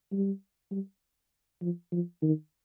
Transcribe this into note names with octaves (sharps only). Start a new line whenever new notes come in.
G3
G3
F3
F3
D#3